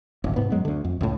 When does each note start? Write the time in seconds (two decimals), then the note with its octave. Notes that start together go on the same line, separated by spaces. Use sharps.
0.24 D1 G#1
0.36 G#2 C3 B3
0.50 F#2 F#3 G#3 B3
0.65 D2 D3
0.84 F2
1.01 C#2 A2